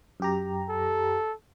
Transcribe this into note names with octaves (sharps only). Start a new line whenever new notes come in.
F#2 G4 A#5
A4